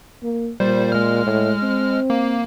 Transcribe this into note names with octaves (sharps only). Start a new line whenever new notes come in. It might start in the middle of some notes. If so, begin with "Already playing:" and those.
A#3
A#2 G3 C5
G#3 F6
A2
C4
A#3